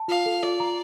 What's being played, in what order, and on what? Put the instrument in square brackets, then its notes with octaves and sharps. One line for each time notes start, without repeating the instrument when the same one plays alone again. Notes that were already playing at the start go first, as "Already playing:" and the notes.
Already playing: [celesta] A5
[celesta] F4 [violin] F5
[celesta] A4
[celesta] F4 [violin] D5
[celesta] A#5